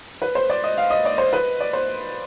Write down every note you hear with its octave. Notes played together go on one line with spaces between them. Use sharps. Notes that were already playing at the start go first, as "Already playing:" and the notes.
B4
C5
D5
D#5
F5
D#5
D5
C5
B4
D5
C5